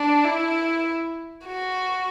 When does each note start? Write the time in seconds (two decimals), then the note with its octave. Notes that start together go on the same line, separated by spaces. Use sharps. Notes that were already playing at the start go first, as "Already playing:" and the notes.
Already playing: D4
0.25 E4
1.46 F#4